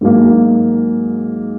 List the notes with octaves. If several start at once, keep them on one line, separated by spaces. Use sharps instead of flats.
G#2 F#3 A#3